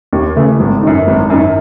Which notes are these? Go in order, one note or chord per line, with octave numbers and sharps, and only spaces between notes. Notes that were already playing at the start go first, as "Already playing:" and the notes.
D#2
C#3 E3 A3
G#1
F#2 D#3
G#1
F#2 D#3